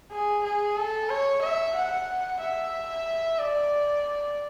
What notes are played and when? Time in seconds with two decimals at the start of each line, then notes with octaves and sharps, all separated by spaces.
0.11 G#4
0.44 G#4
0.77 A4
1.09 C#5
1.42 E5
1.75 F#5
2.40 E5
3.39 D5